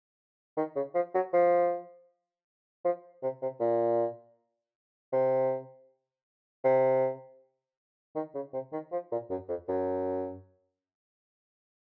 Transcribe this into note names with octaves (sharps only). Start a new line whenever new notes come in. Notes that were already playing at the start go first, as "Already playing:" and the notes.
D#3
C#3
F3
F#3
F3
F3
C3
C3
A#2
C3
C3
D#3
C#3
C3
D#3
F3
A#2
F#2
F2
F#2